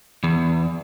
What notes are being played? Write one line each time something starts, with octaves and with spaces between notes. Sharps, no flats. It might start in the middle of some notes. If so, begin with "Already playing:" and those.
E2